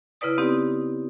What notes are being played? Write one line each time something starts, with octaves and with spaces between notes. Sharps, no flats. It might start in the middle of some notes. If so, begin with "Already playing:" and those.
C#3 E4 B4 D5 D#6
B3 C4 D#4 G4